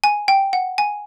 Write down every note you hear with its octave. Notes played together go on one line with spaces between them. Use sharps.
G#5
G5
F#5
G#5